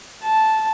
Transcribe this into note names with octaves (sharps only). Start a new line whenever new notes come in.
A5